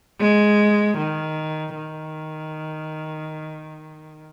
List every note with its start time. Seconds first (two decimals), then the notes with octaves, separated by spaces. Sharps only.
0.20 G#3
0.98 D#3
1.75 D#3